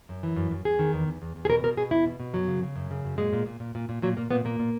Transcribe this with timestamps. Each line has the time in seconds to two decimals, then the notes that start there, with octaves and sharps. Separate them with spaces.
0.09 F#2
0.23 E3
0.36 F#2
0.51 F#2
0.65 E2 G#4
0.79 D#3
0.93 E2
1.07 E2
1.22 E2
1.36 E2
1.45 G#4
1.50 B2 A#4
1.64 B2 A#4
1.77 B2 G#4
1.91 E2 E4
2.05 B2
2.20 B2
2.33 F#2 F#3
2.48 C#3
2.63 C#3
2.76 F#2
2.91 C#3
3.04 F#2
3.18 A#2 G#3
3.33 A#2
3.46 A#2
3.60 A#2
3.75 A#2
3.89 A#2
4.02 A#2 F#3
4.17 A#2 A#3
4.31 A#2 B3
4.45 A#2 A#3
4.59 A#2